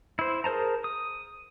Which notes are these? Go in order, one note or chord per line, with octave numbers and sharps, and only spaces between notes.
E4 C5
G#4 A#4 C5 A5 A#5
D#6